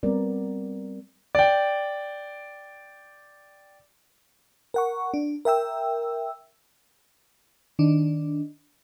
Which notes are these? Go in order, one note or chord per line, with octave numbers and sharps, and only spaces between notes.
G3 B3 C4 A#4 D5
D5 G5
A#4 F#5 C#6
D4
A#4 E5 G5 E6
D#3 D4